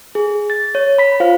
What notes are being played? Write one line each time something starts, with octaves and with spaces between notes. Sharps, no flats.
G#4
A6
C#5
B5 B6
F4 C5 F5